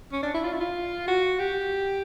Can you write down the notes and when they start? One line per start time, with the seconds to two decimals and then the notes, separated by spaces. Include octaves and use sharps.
0.12 C#4
0.23 D4
0.34 E4
0.44 F4
0.53 E4
0.60 F4
1.08 F#4
1.39 G4